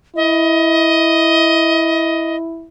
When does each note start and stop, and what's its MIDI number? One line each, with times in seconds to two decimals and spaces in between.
0.16 2.68 64
0.16 2.36 75